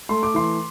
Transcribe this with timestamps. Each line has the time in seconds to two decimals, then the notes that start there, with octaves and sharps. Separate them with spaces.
0.09 A3 C6
0.23 D6
0.34 E3 C6